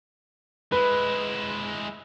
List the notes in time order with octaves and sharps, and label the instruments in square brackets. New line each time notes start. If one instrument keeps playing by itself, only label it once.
[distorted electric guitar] G#3 E4 [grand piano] B4